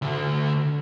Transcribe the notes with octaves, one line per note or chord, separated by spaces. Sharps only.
D2 D3